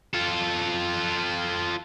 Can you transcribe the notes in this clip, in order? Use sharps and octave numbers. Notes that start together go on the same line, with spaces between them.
F4 A4